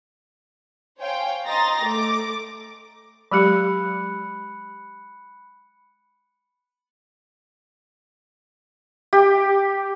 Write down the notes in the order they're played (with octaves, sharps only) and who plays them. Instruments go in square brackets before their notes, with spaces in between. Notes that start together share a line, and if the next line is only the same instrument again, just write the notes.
[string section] C5 C#5 F5 G5 G#5
D#5 G5 A#5 C6 A6 A#6
A3 D6
[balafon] F#3 G#3 G4 [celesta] B5 F#6 C#7
[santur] G4